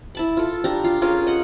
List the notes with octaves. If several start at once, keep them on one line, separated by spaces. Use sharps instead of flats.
E4 A5 B5
F4 A4
D4 G4 A#5
F4 F5
C#4 F4 G#4 A#4
D#5 F#5